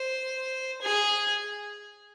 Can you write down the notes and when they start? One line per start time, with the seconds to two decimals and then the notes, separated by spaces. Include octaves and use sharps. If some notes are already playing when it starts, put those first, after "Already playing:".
Already playing: C5
0.82 G#4